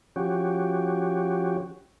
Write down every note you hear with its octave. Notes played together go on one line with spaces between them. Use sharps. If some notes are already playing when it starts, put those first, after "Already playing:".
F3 C#4 F#4 G4